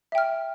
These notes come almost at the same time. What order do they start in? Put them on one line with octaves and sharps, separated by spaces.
E5 G5 F6